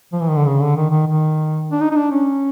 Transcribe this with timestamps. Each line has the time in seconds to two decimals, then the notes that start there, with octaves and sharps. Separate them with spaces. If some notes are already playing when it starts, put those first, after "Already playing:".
0.13 F3
0.20 E3
0.29 D#3
0.37 D3
0.46 C#3
0.61 D3
0.76 D#3
0.90 D#3
1.06 D#3
1.72 D4
1.80 D#4
1.91 D#4
1.96 D4
2.11 C#4